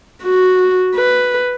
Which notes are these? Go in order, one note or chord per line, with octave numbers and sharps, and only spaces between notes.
F#4
B4